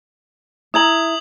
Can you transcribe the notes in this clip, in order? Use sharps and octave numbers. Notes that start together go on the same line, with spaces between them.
E4 A#5 D#6 G#6 F#7